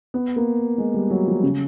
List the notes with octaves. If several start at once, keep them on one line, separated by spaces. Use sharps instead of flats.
B3
A#3
G#3
G3
F#3
F3
C#3